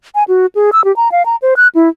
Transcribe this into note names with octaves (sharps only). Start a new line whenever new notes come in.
G#5
F#4
G#4
E6
G4
A#5
F5
A#5
C5
F#6
E4